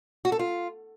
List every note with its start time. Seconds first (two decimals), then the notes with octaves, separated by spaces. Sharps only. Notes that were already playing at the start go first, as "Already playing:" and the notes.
0.25 F#4
0.32 A4
0.39 F4